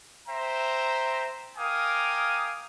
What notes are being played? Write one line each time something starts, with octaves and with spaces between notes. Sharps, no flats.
C5 E5 G5 A#5
A#4 F5 G5 G#5 D6 D#6